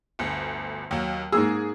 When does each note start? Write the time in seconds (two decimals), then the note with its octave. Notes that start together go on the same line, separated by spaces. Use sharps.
0.19 G1 D2
0.91 D#2 F#3
1.32 G#2 A#3 G#4 E6